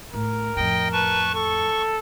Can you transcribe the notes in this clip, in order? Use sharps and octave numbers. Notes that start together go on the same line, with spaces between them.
A2 A#4
F2 A2 D#5 G5
B4 A5 C#6
A4 C#6